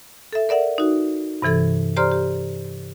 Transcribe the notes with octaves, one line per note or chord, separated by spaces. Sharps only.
A4 E5
A#4 D5 E5 F#5
D#4 F#4
G2 C3 E3 A4 G#6
G4 C5 D5 A#5 C6 F6
G4